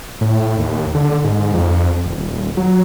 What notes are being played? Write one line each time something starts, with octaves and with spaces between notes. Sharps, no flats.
A2
D#2
D3
G#2
F2
D#1
F#3